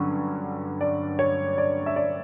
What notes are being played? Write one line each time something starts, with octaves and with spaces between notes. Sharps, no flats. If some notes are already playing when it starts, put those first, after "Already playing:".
Already playing: G2 D3 F#3 C#4
D5
C#5
D5
E5
D5